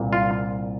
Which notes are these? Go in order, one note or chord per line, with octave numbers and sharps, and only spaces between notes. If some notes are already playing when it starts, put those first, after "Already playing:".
Already playing: C2 A#2
F4